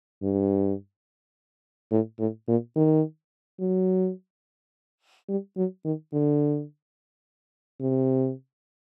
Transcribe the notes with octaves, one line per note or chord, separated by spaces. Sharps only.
G2
A2
A2
A#2
D#3
F#3
G3
F#3
D#3
D3
C3